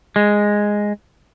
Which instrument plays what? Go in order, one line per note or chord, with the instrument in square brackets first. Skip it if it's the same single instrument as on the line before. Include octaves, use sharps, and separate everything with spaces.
[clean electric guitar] G#3